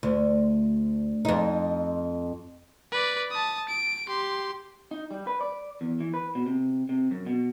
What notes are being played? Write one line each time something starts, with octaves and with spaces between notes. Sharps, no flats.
D2
F2 D#4
B4 D5
A5 D#6
D7
G4 C6
D#4
G3
B4
D5
E2
E3
B4
B2
C3
C3
F#2
B2